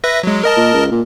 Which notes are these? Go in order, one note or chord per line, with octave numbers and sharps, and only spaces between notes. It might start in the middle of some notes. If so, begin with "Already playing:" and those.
B4 E5 A#6
F#3 G#3
A#4 D#5 A5
A#2
C#2
A#2